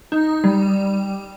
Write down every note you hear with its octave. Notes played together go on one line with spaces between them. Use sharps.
D#4
G3